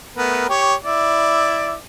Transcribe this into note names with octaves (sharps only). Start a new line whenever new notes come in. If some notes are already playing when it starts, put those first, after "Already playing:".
A3 B3 A#4
G4 C#5
E4 D5